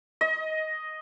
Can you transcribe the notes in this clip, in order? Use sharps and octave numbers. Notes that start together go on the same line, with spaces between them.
D#5